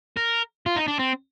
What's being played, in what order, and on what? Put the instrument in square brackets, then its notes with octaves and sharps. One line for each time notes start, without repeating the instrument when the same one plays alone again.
[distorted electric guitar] A#4
F4
D#4
D4
C4